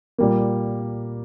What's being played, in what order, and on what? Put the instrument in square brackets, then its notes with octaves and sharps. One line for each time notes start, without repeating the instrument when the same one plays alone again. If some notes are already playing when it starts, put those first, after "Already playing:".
[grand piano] A#2 G3 A#3